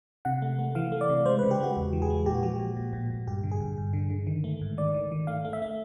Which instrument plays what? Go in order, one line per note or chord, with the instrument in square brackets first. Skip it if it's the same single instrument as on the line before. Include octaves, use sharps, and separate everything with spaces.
[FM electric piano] C3 F#5
A3
A3
E3 F5
A3
D5
C3
G#3 C5
B4
C#3
G4
G#3 F#4
E2
E3
G#4
G#3
A#2 G4
F#4
F3 G4
A#2
A#2
A#2
A#2
G2 G4
D3
G#4
G2
G2
D3
D3
D#3
A3
G#2
D#3 D5
D#3
D#3
A3 F5
A3
E5
A3